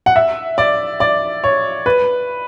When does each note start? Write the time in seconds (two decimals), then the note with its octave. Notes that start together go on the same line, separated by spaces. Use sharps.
0.06 F#5
0.16 E5
0.58 D5
1.00 D5
1.44 C#5
1.86 B4